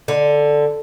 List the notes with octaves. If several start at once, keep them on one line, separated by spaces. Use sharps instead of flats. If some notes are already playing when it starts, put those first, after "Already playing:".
D3